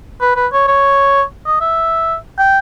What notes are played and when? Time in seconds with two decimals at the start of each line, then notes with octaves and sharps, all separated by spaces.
0.21 B4
0.36 B4
0.52 C#5
0.68 C#5
1.46 D#5
1.61 E5
2.38 G5